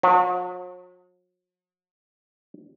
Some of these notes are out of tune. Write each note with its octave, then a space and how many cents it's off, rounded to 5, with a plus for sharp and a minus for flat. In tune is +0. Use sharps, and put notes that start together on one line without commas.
F#3 -45